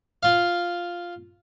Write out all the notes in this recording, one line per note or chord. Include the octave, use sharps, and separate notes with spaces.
F4 F5